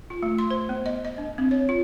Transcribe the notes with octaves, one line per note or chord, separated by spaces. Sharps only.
F4
A3
C6
C5
B3
D#5
D#5
D4
C4
C#5
F4